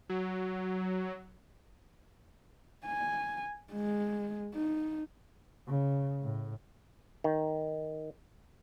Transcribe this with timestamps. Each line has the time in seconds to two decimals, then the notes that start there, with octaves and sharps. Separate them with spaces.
0.09 F#3
2.86 G#5
3.73 G#3
4.55 D#4
5.68 C#3
6.22 A2
7.24 D#3